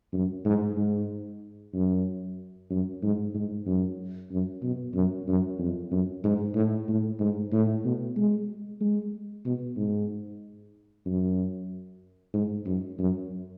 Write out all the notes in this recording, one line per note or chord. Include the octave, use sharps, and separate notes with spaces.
F#2
G#2
G#2
F#2
F#2
G#2
G#2
F#2
F#2
B2
F#2
F#2
F2
F#2
G#2
A2
A2
G#2
A2
B2
G#3
G#3
B2
G#2
F#2
G#2
F#2
F#2